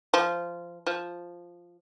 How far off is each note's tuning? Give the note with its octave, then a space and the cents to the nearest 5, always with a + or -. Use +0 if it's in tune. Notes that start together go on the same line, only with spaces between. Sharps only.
F3 -15
F3 +0